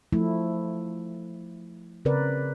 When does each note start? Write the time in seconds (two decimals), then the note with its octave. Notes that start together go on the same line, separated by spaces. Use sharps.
0.13 F3 A3 E4
2.05 C#3 C4 A#4 B4 D5